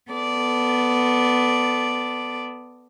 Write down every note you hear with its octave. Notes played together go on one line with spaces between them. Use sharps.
B3 A4 D5